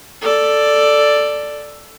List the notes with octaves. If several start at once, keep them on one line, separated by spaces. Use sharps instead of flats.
A4 D5